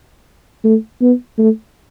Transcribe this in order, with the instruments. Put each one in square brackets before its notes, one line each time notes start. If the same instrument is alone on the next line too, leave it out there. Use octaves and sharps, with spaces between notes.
[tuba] A3
B3
A3